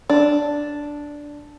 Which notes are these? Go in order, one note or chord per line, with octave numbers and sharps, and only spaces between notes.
D4